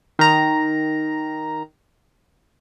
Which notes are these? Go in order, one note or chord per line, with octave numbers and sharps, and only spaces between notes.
D#3 A#5